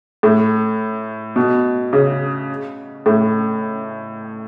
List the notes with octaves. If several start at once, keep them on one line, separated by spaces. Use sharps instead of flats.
A2
B2
C#3
A2